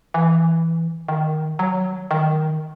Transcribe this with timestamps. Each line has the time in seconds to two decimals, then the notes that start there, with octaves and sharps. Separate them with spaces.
0.14 E3
1.08 D#3
1.59 F#3
2.11 D#3